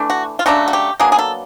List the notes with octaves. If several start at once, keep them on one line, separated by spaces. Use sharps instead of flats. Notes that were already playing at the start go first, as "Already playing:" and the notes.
Already playing: E3 A3 D4
F#4
F4
C#3 F#3 A3 D4 F#4
F#4
G4
B2 F#3 A#3 D4 G#4
G#4
A4